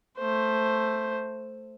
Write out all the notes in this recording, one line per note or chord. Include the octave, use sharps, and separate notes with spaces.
A3 C5